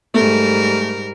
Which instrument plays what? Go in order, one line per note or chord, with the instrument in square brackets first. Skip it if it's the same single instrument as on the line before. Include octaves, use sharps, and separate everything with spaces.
[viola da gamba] G#2 G3 A#4 [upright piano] A3